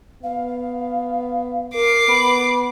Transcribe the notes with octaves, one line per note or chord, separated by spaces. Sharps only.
B3 F5
A#4 D6 C7
B3 B5